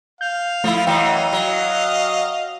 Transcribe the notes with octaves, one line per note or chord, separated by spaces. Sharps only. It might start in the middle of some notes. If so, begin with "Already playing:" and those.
F5 G6
F3 A3 E4
F#2 E3 D#5 F5 G5
F#3